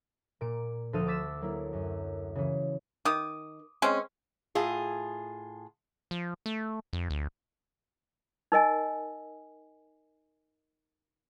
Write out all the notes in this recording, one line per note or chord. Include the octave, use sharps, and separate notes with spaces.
A#2 A#3 D7
D2 F3 A4 C5 D#6 F6
D6 E6 A6 B6 E7
F#3 A#3 E4
F#2
C#3 E3
D#3 D6 D#6
G#3 C4 C#4
A2 F4 G#4
F3
A3
F2
D2
D#4 A#4 D#5 G#5